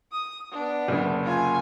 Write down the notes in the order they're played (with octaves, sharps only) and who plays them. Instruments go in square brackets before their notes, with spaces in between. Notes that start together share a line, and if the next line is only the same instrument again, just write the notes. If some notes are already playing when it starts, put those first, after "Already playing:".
[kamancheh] D#6
B3 D4
[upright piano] F#1 D2
[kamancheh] F4 G#5